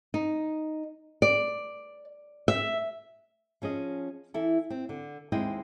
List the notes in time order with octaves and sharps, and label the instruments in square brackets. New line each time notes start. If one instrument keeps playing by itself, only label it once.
[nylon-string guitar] D#4
D5
E5
F3 C#4 G#4 D#5
E3 E4 A4
C4
D3
D#2 G#3 C4 E4 D#5 G5